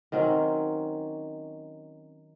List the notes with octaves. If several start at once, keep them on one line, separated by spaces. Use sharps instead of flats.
D#3 F#3 C4 C#4